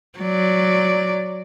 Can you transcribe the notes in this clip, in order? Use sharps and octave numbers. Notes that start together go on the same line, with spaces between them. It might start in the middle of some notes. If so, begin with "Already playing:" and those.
F#3 D5